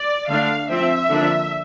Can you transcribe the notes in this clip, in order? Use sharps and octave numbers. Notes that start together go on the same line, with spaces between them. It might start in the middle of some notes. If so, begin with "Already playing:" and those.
Already playing: D5
D3 A3 D4 F5
F3 C4 E5
D3 F3 A#3 D4